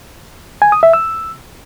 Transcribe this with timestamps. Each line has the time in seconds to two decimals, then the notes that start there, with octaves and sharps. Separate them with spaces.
0.62 G#5
0.72 D#6
0.83 E5
0.93 E6